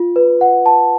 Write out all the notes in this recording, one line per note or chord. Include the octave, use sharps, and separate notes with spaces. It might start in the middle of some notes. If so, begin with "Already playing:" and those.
Already playing: F4
B4
F#5
A5